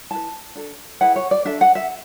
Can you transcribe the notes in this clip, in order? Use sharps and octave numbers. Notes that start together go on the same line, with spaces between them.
E4 B4 A5
D4 A4
E4 G#4 B4 F#5
C#5
D5
D4 A4 E5
F#5
E5